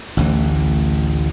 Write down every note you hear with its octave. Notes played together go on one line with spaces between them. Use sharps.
A1 D2 E3